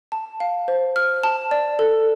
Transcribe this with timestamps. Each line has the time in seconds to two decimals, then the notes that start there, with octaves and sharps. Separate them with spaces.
0.12 A5
0.40 F5
0.68 C5
0.96 F6
1.24 A5
1.51 D5
1.79 A4